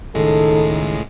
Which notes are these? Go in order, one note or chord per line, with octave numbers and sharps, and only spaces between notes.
C#2 A2 D#3 G#3 A4